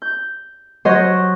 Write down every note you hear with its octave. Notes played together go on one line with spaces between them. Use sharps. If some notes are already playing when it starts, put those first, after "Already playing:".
G6
F#3 C5 C#5 D#5